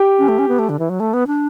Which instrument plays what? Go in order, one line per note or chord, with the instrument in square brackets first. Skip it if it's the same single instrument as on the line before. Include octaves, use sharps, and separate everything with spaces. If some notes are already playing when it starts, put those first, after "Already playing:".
Already playing: [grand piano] G4
[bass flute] C#4
A3
C#4
B3
A3
D3
E3
F#3
A3
B3
D4